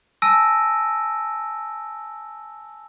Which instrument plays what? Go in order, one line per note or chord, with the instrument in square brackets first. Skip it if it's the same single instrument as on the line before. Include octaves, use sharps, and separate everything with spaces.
[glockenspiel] G#5 A5 E6 A#6 D7 D#7